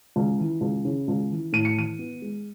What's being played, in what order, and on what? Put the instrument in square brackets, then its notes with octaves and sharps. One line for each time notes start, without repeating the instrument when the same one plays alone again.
[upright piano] C#2
E3
C#2
C#3
C#2
E3
A2 D#7
C#7
E3 D#7
B3
G#3